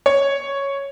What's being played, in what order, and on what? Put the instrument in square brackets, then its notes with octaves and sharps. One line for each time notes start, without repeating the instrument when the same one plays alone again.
[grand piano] C#5